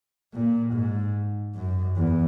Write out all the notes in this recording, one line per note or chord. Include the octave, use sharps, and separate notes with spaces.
A#2
G#2
F#2
E2